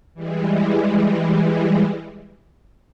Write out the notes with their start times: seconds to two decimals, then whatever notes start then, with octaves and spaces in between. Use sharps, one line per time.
0.14 E3 G3 G#3